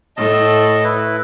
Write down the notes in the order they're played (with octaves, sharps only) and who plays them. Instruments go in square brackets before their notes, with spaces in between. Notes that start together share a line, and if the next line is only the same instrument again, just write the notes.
[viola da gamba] A2 [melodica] D#5 A5
[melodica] E4 B4